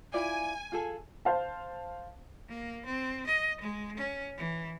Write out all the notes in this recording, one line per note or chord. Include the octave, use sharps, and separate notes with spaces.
E4 F4 D5 G#5
F4 G#4 A4
C5 F5 A5
A#3
C4
D#5
G#3
C#4
E3